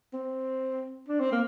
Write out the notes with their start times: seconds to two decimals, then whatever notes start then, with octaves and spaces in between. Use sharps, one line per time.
0.14 C4
1.08 D4
1.20 C4
1.32 A#3